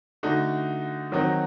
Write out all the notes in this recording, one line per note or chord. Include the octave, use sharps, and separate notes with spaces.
D3 A3 D#4 F#4
D#3 F#3 C4 D#4 F#4